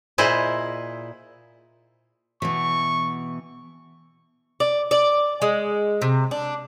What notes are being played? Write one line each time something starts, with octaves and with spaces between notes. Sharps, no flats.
A#2 E4 G#4 C5 D#5
B2 E3 C#6
D5
D5
G#3
C3
D4